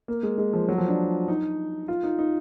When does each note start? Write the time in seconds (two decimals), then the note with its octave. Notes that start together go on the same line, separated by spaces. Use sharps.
0.08 A#3
0.23 G#3
0.38 G#3
0.53 F3
0.68 F#3
0.78 F3
0.88 D4
1.28 D#4
1.88 F4
2.03 D#4
2.19 D#4